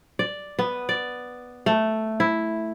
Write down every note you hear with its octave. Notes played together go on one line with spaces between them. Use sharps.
D5
B3
D5
A3
E4